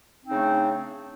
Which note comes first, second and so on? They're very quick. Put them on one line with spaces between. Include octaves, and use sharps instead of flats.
C4 D#4 C#3 D4 A3